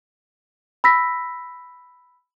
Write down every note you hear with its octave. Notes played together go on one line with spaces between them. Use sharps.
B5 E6 A#6 B6